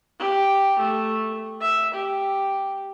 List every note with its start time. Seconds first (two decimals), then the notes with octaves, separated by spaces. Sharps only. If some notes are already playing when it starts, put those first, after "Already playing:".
0.19 G4
0.79 A3
1.61 E5
1.94 G4